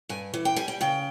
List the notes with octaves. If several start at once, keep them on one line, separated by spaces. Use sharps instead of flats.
G2 G#5
E3
G5
G3 G#5
G5
C#3 G5